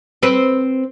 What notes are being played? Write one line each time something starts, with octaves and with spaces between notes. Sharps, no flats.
C4 B4